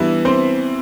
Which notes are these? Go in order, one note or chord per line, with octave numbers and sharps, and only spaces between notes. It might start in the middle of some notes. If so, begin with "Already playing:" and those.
Already playing: G2 E3 G3 B3 E4 E5
C4 C5